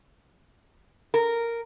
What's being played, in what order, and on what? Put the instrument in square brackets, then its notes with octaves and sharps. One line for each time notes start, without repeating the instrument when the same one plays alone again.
[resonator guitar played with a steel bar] A#4